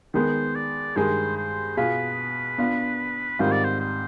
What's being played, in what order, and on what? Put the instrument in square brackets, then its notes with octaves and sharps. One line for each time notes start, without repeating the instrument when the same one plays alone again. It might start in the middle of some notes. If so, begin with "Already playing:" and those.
[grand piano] D#3 G#3 B3 [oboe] C5
[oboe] D5
[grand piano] G2 D#3 G#3 [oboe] C5
[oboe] C5
[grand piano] B2 B3 F4 G#4 [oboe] B4
[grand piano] B3 D4 F4
[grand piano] G#2 D#3 G3 C4 F4 [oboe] C5
[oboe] D5
C5
C5